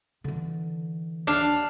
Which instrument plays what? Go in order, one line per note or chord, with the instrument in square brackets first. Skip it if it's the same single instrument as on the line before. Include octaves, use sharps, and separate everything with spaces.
[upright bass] D3 E3
[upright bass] D#2 [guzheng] D4 F5